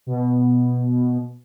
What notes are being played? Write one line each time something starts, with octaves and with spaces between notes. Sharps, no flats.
B2